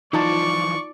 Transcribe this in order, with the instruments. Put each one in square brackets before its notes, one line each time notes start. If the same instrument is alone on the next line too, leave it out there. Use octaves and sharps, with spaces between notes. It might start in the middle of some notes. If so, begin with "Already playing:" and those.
[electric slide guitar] E3 F3 [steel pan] D#4 F4 A5 [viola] D5 [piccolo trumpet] C#6